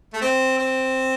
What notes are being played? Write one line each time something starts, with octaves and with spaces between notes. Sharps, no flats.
A3
C4
C4